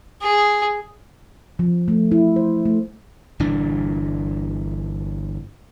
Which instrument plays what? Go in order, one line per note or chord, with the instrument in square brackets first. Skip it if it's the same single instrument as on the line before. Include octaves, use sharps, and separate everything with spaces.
[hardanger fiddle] G#4
[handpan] F3
A3
E4
C5
A3
[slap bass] G1 A#2 E3 D4